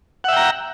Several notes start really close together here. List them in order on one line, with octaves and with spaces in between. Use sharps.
F#5 E5 G5 A#5